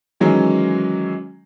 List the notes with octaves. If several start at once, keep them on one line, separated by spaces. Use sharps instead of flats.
D#3 E3 F#3 G#3 C#4